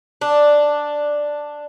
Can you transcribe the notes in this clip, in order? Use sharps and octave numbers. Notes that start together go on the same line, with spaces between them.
D4